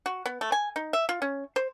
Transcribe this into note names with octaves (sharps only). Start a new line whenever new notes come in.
F#4
B3
A3
G#5
D#4
E5
F4
C#4
C5